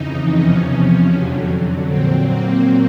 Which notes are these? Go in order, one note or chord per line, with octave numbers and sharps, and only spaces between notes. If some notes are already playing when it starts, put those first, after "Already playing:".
Already playing: F2 C#3 E3 D#4
E2 C3 F3 C#4
F2 D3 F#3
A#2 F#3 C4
A#3